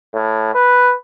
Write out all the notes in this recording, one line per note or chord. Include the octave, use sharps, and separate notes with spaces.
A2
B4